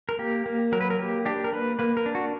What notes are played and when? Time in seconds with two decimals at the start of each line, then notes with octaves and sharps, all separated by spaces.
0.09 A#4
0.19 A#3 G4
0.46 A#3
0.72 F#3 A#4
0.81 B4
0.90 A#4
0.99 A#3 G4
1.25 D4 G4
1.44 A#4
1.53 A#3 B4
1.79 A#3 B4
1.97 A#4
2.06 D4
2.15 F#4